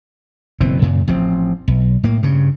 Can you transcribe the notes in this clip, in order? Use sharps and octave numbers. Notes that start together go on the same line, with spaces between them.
F#1 B2 E3 C4
F#2 A#2 C#3
A1 F3 C4
B1
A2 A#3
G2 C#3